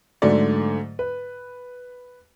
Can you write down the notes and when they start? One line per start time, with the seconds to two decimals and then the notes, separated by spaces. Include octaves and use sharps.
0.22 G#2 D3 F#3 A3 D5
0.99 B4